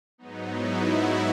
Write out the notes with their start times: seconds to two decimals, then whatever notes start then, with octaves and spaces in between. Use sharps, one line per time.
0.18 G#2 F#3 B3 D#4
0.51 E4
0.84 F#4